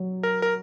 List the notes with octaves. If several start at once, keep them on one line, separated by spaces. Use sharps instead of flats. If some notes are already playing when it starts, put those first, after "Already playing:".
Already playing: F#3
A#4
A#4